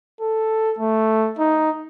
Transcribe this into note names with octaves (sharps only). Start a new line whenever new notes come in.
A4
A3
D#4